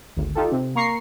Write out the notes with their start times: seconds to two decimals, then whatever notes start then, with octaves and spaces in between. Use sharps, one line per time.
0.17 G#1 D2
0.35 D#4 F4 G4 A4
0.52 C3
0.75 A#3 A#5 C#6 C7